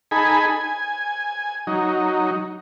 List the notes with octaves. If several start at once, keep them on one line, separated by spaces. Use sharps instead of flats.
D#4 G#4 A4 G#5 B5
G#5
F#3 D#4